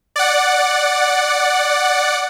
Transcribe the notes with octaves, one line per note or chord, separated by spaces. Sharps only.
D5 F#5